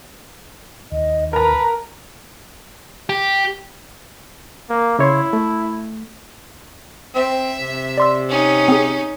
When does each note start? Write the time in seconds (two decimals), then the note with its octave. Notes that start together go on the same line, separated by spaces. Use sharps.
0.92 D#2 D#5
1.33 A#4 B4 A5 A#5
3.09 G4
4.69 A#3
4.99 C#3 E4 C#5 C6
5.33 A3
7.15 C4 E5
7.61 C3
7.97 D5 C6 E6
8.29 C#4 D#4
8.68 C4 G#4